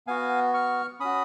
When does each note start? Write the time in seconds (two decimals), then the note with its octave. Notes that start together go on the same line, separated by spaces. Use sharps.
0.07 B3 F#4 F5 G#5
0.54 C#6 F6
1.00 C#4 F#4 B5 D#6